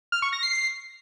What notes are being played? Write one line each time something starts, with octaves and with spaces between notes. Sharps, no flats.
F6
C#6
A#6
C7
C7